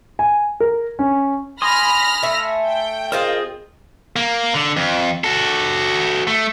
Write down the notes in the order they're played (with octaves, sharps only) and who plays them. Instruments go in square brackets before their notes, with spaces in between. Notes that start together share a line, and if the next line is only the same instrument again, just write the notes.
[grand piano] G#5
A#4
C#4
[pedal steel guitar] G#5 C6 D#6 [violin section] B5 F6 A#6
[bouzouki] A3 E5
[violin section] G5
[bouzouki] C4 F4 G#4 [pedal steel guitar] A#4 D#5
[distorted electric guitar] A#3
D3
F2
F#4 A4
A3